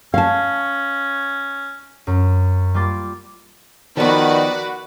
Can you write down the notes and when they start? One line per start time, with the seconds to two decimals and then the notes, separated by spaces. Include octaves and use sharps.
0.14 C#4 F5 A5
2.07 F#2
2.74 G3 A#3 F4 C6 D6 A6
3.97 D#3 F3 B3 F#4 B4 D5